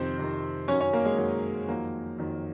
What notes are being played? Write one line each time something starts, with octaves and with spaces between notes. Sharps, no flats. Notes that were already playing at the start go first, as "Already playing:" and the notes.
Already playing: F2 C3 D#3 C4 C5
F2 C3 D#3
F#2 D#3 F#3 C#4 C#5
C#4 C#5
A#3 A#4
G#3 G#4
F#2 D#3 F#3
F2 D#3 F#3 A#3
F2 D#3 F#3